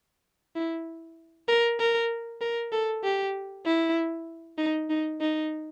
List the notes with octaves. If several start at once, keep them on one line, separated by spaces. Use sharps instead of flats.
E4
A#4
A#4
A#4
A4
G4
E4
D#4
D#4
D#4